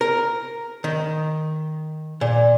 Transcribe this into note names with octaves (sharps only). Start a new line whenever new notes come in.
A#4
D#3
A#2